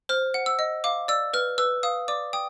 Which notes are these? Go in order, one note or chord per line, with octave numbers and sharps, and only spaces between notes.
C5 F6
F#5
E6
D#5
F5 D6
D5 E6
B4 F6
B4 E6
F5 D#6
D5 D6
G5 D#6